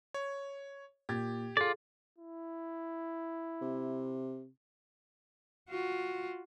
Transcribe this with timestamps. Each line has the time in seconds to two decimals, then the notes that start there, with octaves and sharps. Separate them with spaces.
0.14 C#5
1.09 A#2 G4 G#6 A6
1.57 F4 G#4 A4 D5
2.18 E4
3.61 C3
5.69 F4 F#4